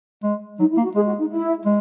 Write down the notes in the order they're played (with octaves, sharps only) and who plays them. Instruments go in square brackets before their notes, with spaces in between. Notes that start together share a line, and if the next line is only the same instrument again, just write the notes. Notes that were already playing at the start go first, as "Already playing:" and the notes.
[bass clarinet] G#3
[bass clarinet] F#3 [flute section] D#4
[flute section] E4
[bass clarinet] A#3
[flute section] F#4
[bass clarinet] G#3 [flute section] G#4
[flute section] F#4
D#4
E4
[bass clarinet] G#3